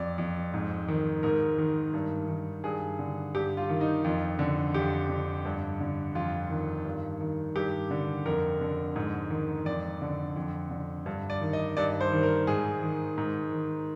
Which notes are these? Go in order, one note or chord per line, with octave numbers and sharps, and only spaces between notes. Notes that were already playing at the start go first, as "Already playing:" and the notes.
Already playing: F2 D5
F2
G#2
D#3
G#2 A#4
D#3
G2
D#3
G2 G#4
D3
G2 G4
F4
D#3
D#4
F2 F4
D3
F2 G4
D3
G2
D3
F2 F4
D#3
G2
D#3
G2 G4
D3
F2 A#4
D3
G#2
D#3
F2 D5
D3
F2
D3
G2
D5
D#3
D#5
G2 D5
C5
D#3
A#4
G#2 G#4
D#3
G#2
D#3